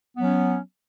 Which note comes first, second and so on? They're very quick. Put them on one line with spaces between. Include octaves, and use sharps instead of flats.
B3 F#3 C#4